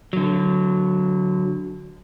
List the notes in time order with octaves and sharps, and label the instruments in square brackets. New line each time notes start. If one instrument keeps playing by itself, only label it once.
[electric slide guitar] D3 F#3